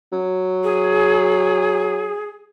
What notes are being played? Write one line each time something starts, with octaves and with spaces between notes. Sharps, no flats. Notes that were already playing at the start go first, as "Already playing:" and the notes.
F#3
G#4